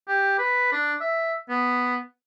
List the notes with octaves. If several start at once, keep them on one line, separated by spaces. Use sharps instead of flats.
G4
B4
D4
E5
B3